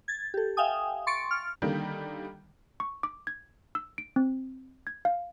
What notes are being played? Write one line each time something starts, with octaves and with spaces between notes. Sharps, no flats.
G#6 A6
G4 A4
E5 F5 G5 G#5 D#6
C6 C#6 A6 C#7 D7
F6
D3 D#3 G3 A#3
C#6
D6
G#6
E6
D7
C4
G#6
F5